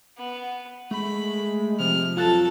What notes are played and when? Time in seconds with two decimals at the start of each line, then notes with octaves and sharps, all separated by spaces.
0.18 B3
0.91 G#3 A3 B5
1.79 C3 F3 F6
2.17 F2 F#3 F4 A4 A5 F#6 A6